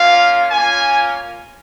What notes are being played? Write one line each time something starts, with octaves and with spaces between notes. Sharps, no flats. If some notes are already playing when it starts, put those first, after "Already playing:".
Already playing: A#3 C#4 F4 F5
A#3 C#4 F4 G#5